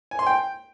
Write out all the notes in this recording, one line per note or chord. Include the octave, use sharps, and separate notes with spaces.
G#5
C6
G5